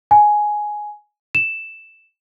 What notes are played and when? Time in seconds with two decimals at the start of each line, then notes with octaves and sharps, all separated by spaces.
0.11 G#5
1.35 E7